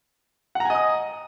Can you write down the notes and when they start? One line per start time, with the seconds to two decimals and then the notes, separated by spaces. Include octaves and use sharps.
0.55 F#5
0.60 A#5
0.65 G#5
0.70 D#5
0.75 D#6